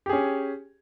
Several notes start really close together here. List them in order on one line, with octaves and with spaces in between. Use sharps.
G4 G#4 C#4